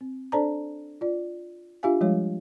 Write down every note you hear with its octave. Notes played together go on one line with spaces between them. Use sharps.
C4
D4 A4 C5 D5 A5 A#5
F4 D5
D4 F4 G4 E5 F5 G#5
F3 G3 G#3 G4 C#5